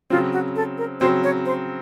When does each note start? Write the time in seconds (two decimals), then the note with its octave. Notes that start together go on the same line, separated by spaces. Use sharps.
0.10 C#3 F#3 C4 F4
0.32 F#4
0.56 A4
0.78 A#4
1.00 C#3 F#3 C4 C5
1.24 C#5
1.45 C5